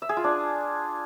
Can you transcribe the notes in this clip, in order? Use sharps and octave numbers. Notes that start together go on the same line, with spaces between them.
E5
G#4
F4
D4